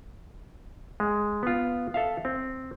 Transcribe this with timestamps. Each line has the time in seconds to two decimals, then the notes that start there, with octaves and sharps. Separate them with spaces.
1.00 G#3
1.43 B3 F4
1.94 A4 E5 F5
2.25 C4